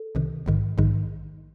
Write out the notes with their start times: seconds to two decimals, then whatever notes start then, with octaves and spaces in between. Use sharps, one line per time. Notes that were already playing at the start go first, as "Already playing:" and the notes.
Already playing: A4
0.15 C2 C3 D#3
0.46 A#1 G#2 D#3
0.78 A#1 G#2 D#3